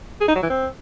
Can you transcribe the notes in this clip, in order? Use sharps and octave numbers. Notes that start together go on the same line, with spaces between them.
G#4
D#4
F#3
E3
C4